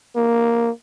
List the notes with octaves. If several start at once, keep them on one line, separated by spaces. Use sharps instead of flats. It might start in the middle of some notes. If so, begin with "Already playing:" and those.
A#3